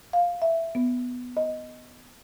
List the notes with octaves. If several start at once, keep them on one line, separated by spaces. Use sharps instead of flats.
F5
E5
B3
D#5